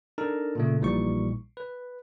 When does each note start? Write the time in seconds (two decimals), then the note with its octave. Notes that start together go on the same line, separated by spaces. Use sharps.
0.18 D4 D#4 A4 A#4 A5
0.55 A#2 C#3 A3
0.81 A#1 A#2 E3 G3 D#4 C#6
1.57 B4